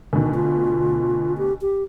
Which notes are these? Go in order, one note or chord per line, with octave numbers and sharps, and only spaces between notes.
D2 B2 D#3
F4
G4
G4